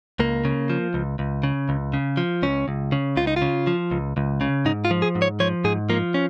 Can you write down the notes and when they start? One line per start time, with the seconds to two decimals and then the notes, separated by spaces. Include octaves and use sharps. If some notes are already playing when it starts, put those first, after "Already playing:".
0.19 C#2 A#3
0.45 C#3
0.70 F3
0.94 C#2
1.19 C#2
1.43 C#3
1.69 C#2
1.94 C#3
2.17 F3
2.43 C#2 C#4
2.68 C#2
2.92 C#3
3.17 C#2 F4
3.27 D#4
3.36 F4
3.42 C#3
3.67 F3
3.91 C#2
4.17 C#2
4.41 C#3
4.65 G#2 D#4
4.85 F4
4.91 F3
5.02 G#4
5.15 G#2
5.22 C#5
5.40 F3 C#5
5.64 G#2 G#4
5.89 F3 A#3
6.14 C#4